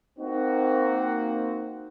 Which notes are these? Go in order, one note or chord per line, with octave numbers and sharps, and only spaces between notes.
A#3 C4 D#4 F#4